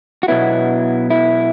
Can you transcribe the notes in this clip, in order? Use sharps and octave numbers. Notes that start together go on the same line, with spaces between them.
F#4
B2 F#3 B3 E4
E4